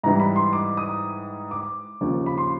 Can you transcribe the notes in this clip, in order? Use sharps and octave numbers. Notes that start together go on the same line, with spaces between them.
G#2 E3 G3 A#5
B5
C6
D6
D#6
D6
D#2 C#3 F3
B5
C6